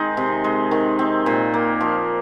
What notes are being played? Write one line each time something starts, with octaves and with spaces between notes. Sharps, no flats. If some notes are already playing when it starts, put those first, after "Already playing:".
Already playing: D#3 G#3 C4 D#4
C3
G#3
D#3
C4
A#2
A#3
F3